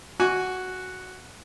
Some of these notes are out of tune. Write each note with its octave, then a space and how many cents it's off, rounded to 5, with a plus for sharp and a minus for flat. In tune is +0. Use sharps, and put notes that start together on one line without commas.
F#4 +0 G#5 +0